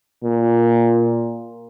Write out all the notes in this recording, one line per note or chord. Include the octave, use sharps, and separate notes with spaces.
A#2